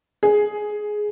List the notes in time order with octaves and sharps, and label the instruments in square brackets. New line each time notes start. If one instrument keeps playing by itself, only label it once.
[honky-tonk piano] G#4